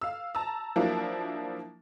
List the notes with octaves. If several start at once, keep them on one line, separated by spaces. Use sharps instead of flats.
F5 E6
A5 A#5 E6
F3 F#3 A#3 D4 E4